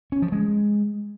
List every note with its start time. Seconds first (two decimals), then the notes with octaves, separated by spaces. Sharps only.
0.12 C#4
0.22 F3
0.32 G#3